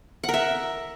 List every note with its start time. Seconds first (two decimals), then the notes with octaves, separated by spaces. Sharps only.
0.23 F#5
0.29 A#4
0.34 E5